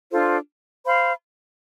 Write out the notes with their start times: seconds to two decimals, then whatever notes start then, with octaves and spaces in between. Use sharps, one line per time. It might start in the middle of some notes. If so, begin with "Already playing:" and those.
0.11 D4 F4 A4 C5
0.86 C5 F5 B5